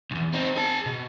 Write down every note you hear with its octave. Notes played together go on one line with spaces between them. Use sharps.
B1 E2
C4 D#4
G#4 A5
B2